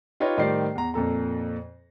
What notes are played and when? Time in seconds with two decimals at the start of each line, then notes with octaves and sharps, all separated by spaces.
0.20 D#4 F4 G4 B4 C#5 D#5
0.38 A2 D#3 G3 C5 D5 C7
0.75 E2 A#5
0.94 F2 A#2 A4 A#5